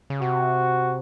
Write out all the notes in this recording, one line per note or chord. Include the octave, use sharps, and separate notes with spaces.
C#3
C3 F#4